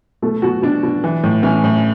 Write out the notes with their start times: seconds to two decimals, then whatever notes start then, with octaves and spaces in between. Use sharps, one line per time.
0.22 B2 A3
0.42 B2 F#4
0.62 B2 D4
0.83 B2
1.04 E3
1.24 A2
1.43 E3 C#4
1.64 A2